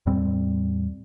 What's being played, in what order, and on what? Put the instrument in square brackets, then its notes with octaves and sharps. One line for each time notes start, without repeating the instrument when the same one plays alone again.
[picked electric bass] E2 A2 G3 C4